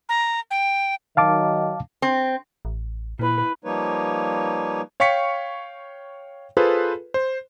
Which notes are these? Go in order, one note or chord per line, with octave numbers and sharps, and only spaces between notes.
A#5
G5
D#3 F#3 D#5 F5 A5 D6
C4
A1
A#2 E4 B4
F3 G3 A#3 D#4 B4 C#5
C#5 F5 G5 C#6 B6 C#7
F4 G#4 A4 B4 C5
C5